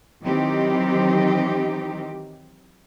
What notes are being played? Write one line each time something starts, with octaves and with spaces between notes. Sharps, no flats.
D#3 E3 F#3 C4 D#4 G4